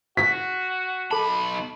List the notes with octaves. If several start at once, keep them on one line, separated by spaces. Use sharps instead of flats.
F#4 B6
B1 A4 A5 B5